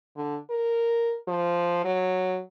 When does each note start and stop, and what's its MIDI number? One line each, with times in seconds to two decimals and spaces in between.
0.17 0.38 50
0.50 1.16 70
1.28 1.80 53
1.85 2.40 54